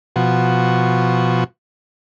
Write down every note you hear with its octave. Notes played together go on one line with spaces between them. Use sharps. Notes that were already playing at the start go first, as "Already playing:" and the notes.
B2 F3 F#4